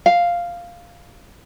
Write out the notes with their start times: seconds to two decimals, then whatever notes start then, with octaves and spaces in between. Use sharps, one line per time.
0.06 F5